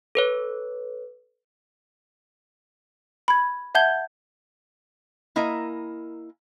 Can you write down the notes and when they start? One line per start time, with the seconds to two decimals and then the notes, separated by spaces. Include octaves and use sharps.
0.15 A4 B4 C#5
3.28 B5 G#6
3.75 E5 F#5 A5 G6 G#6 G7
5.36 A#3 E4 A#4 D#5 G#5 A#5